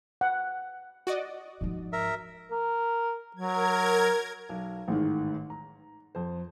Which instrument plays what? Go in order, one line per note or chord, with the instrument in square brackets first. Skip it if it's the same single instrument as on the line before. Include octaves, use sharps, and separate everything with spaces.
[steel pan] F#5
[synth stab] F#4 D5 D#5
[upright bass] G#2 F3
[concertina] A#4 E5
[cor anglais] A#4
[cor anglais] F#3 [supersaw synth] A#4 G#6
[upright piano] B1
A1 G#2 D#3
A#5
F2 C5